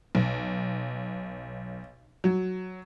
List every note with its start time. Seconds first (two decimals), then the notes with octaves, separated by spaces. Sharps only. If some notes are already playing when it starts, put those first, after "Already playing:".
0.15 B1
2.24 F#3